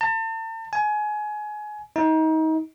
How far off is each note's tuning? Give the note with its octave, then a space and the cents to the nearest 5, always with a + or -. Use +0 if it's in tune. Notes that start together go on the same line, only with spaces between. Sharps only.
A5 +40
G#5 +25
D#4 +30